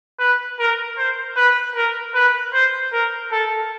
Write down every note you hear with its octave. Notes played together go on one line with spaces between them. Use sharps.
B4
A#4
C5
B4
A#4
B4
C5
A#4
A4